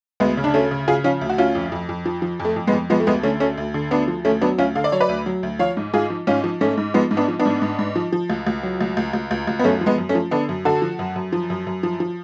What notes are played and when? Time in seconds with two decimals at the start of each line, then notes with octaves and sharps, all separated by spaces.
0.20 D2 G#3 B3
0.37 C#3
0.44 D4
0.54 D2 A3 C#4
0.71 C#3
0.88 C#3 F4 G#4
1.04 F3 C#4 F4
1.21 D2
1.29 F#4
1.38 D2 C#4 F4
1.55 F2
1.72 F2
1.89 F2
2.06 F3
2.22 F3
2.40 F2
2.45 A3
2.56 F2
2.67 G#3 B3
2.73 F2
2.90 F3 G#3 B3
3.00 A3
3.07 D2 G#3 B3
3.23 D3 A3 C#4
3.40 D2 A3 C#4
3.57 D2
3.74 D3
3.91 D2 B3 D4
4.08 F3
4.25 D2 A3 C#4
4.41 F#3 B3 D4
4.58 D2 C#4 F4
4.75 D3 F5
4.84 D5
4.92 F#3 C#5
5.00 B4 D5
5.09 D2
5.26 F#3
5.43 D2
5.59 F3 C#5 F5
5.77 G#2
5.93 G#2 F4 G#4
6.10 F3
6.27 G#2 C#4 F4
6.44 F3
6.61 G#2 A3 C#4
6.77 G#2
6.94 F3 G#3 B3
7.11 G#2
7.17 B3 D4
7.28 F3
7.39 B3 D4
7.45 G#2
7.62 G#2
7.79 G#2
7.96 F3
8.13 F3
8.30 C#2
8.47 C#2
8.63 F#3
8.81 C#2
8.97 C#2
9.13 C#2
9.31 C#2
9.47 C#2
9.59 B3
9.64 F#2 A3 C#4
9.81 F3
9.86 G#3 B3
9.98 F#2
10.09 A3 C#4
10.15 F3
10.31 D3 B3 D4
10.49 F#2
10.65 D3 F#4 A4
10.82 F3
10.99 F#2
11.16 F#2
11.33 F3
11.50 F#2
11.67 F#2
11.83 F3
12.00 F3